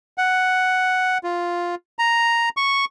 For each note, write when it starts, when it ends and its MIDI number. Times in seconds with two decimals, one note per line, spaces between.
0.18 1.18 78
1.23 1.75 65
1.99 2.49 82
2.57 2.85 85